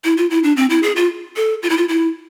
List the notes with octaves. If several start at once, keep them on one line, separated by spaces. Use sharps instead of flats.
E4
F4
E4
D4
C4
E4
G#4
F4
A4
F4
E4
F4
E4